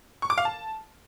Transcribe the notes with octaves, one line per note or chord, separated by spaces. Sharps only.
C#6
D6
F5
A5